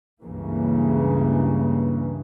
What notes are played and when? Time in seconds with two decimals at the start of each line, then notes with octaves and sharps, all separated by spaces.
0.22 C#2 G2 C#3 E3 A#3